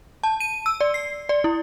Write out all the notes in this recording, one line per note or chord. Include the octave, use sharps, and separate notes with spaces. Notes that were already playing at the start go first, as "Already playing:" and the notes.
A5
D#7
E6
D5
C7
D5
E4